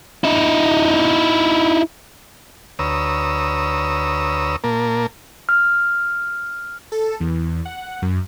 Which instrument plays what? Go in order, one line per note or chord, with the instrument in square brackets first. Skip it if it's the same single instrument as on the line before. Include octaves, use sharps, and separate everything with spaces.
[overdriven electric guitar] D#4 E4
[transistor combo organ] D2 B4 C#5 A#5 D#6 E6
A#2 A#3 A#4 A5
[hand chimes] F6
[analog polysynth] A4
E2
F#5
F#2